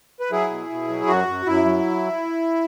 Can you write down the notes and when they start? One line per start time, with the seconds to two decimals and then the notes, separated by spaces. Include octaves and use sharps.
0.20 B4
0.31 F#3 E4 G#4
0.50 B2
0.70 B2
0.88 F#3
1.08 F#2 F#4
1.27 F#2
1.46 F#2 E4
1.65 F#3